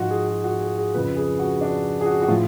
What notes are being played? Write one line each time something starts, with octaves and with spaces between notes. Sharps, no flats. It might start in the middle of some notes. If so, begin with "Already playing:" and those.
Already playing: G#2 F3 F4 F#4
G#4
F#4
F#4
G#4
G#4
F2 C#3 F3 B4
G#4
F#4
D4
G#4
F#4
F#4
A2 F3 F4